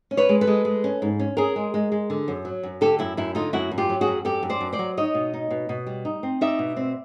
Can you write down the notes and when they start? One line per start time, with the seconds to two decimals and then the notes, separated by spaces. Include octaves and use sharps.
0.11 C#4
0.17 B4 C#5
0.29 G#3
0.41 A4 B4
0.47 G#3
0.65 G#3
0.84 C#4
1.02 G#2
1.19 C#4
1.37 C#4 G#4 A#4
1.56 G#3
1.74 G#3
1.92 G#3
2.10 D3
2.28 F#2
2.45 F#3
2.63 F#2
2.81 D3 G4 A4
2.99 F#2 E4
3.17 F#2 E4
3.35 D3 D#4 F4
3.53 F#2 E4 F#4
3.71 F#2
3.78 F4 G4
3.89 F#3
4.01 F#4 G#4
4.07 F#2
4.25 F#2 G4 A4
4.43 F#2
4.50 C5 D5
4.61 F#2
4.73 C5 D5
4.79 F#3
4.97 D#4 C#5 D#5
5.15 B2
5.34 D#4
5.50 B2
5.69 B2
5.87 G3
6.05 D#4
6.23 C4
6.41 D#4 D5 E5
6.59 B2
6.76 C4